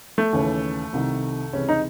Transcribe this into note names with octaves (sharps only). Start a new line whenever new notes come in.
A3
D#2 C#3 E3
C2 C3 D#3
C#2 C3 E3 C#4
D#4